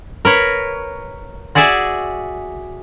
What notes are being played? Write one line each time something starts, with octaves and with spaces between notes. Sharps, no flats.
A#4 B4 C#5
F#4 G#4 D5 E5 G#5